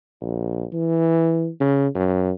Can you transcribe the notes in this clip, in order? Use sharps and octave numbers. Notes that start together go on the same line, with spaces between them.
A#1
E3
C#3
F#2